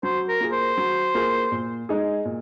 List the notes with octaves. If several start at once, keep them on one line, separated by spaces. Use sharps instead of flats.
F#3 C5
A#4
A#3 F4 G#4
C5
F#3
A#3 F4 G#4
A#2
G#3 D#4 G#4
A#2